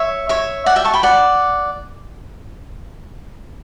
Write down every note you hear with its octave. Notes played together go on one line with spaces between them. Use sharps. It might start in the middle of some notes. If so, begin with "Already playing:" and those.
Already playing: C#5 E5
C#5 E5
D5 F#5
E5 G5
A5 C#6
G5 B5
D5 F#5